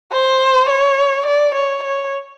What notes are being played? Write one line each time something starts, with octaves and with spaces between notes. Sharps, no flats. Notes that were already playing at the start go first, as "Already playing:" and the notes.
C5
C#5
D5
C#5
C#5